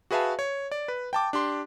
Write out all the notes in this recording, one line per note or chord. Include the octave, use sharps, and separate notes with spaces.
F#4 G#4 B4 E5 F5 A5
C#5
D5
B4
G5 A5 D6
D4 G4 C6